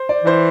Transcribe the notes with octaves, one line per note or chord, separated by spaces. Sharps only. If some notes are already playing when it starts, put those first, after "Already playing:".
Already playing: C5
D5
E3 C5